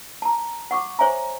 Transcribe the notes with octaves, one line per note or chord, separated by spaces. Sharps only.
A5 A#5
F#5 C#6 D6
C5 C#5 E5 G#5 A#5